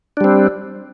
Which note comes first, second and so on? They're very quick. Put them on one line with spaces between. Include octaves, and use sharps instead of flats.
D4 G3 C4